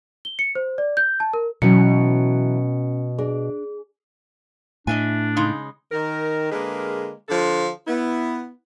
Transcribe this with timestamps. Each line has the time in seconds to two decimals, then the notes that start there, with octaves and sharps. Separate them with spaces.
0.25 G7
0.39 C#7
0.55 C5
0.78 D5
0.97 G6
1.20 A5
1.34 A#4
1.62 B2 E3 F#3 C#4 C#7
3.19 D4 G#4
4.87 A2 D4 D#5 E5 G#5
5.36 C#3 G#3 D#4
5.92 D#3 A#4
6.51 D3 G#3 A#3 G#4 A#4 B4
7.29 D3 F3 F4 A4
7.87 B3 E4